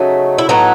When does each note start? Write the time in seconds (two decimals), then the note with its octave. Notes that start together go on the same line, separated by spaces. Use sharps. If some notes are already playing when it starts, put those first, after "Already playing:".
Already playing: C#3 F#3 A3 D#4
0.38 E4
0.49 A2 F#3 B3 D#4